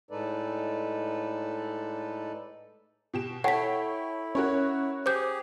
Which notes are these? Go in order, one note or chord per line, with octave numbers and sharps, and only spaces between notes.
A2 G#3 D#4 A4 B4 D5
B2 G4 E7
E4 A4 C#5 F#5 G5 B6
C#4 F#4 A#4 C#5
G4 G#4 C5 D6 G6